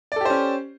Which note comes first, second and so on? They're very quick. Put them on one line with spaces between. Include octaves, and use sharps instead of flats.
D5 A4 G4 C5 C#4